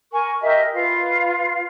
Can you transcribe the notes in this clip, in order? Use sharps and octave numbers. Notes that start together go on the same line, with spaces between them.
A#4 G#5 C#6
G4 A#4 D#5 E5
F4 B4 F5